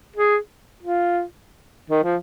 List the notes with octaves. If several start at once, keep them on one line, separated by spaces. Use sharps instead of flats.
G#4
F4
D#3
F3